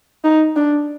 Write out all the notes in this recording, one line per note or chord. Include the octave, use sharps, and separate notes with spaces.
D#4
D4